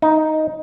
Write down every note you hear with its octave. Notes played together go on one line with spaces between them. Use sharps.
D#4